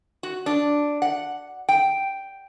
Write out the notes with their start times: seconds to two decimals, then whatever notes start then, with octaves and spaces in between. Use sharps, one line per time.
0.23 F#4
0.46 D4
1.02 F#5
1.69 G5